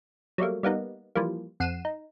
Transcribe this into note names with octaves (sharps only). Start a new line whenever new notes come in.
F#3 G3 A3 A#3
G3 A#3 B3 D#4
E3 F3 G3 A#3
F2 F#5 C7 D#7 E7
D#4